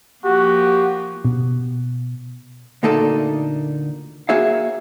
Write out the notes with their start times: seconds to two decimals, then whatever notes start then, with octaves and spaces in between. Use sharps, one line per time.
0.24 F3 A#3 F#4 G4
1.25 B2
2.83 D2 A#2 A#3 D#4 A4 D5
4.29 A#3 F#4 G#4 C#5 E5 F5